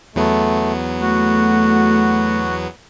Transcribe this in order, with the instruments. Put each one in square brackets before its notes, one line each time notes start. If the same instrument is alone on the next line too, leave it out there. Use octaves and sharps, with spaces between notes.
[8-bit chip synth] E2 F#3 B3 [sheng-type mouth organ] A3
[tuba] A3 [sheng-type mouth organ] F#4